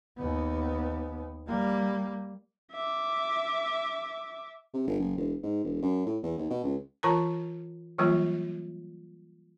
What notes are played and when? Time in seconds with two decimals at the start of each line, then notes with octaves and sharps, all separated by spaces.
0.18 D#2 B3
1.47 G3 A#3
2.72 E5 D6
4.74 C3
4.87 G1
5.00 F#1
5.17 E1
5.43 G#2
5.64 E1
5.83 F#2
6.06 A2
6.23 E2
6.38 D#2
6.50 B2
6.64 C#2
7.03 E3 F4 A#4 A5 A#5
7.98 E3 F#3 G3 A#3 F4